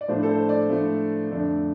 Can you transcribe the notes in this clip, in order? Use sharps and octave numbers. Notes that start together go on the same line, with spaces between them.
D5
A2 F3 A3 D4 C5
A4
C5
D5
A2 F3 A3 D4
F2 D3 A3 D4